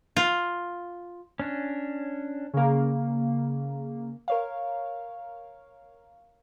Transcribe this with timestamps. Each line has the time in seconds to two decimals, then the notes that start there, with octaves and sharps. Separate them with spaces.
0.16 F4
1.40 C#4 D4
2.53 C#3 A#3
4.28 A#4 C#5 F5